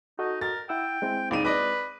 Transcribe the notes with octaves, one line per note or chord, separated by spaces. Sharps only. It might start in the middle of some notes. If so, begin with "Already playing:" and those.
D#4 F#4 A4 D#5
A#4 A6
E4 F#5 G5 E6
G#3 C4 E4
C#2 D#4 D5 D#7
B4 D5 D#5 D6